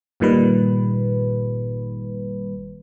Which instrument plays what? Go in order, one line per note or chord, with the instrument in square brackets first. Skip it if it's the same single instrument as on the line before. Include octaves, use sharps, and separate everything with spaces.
[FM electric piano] G1 G2 A#2 D#3 G3 B4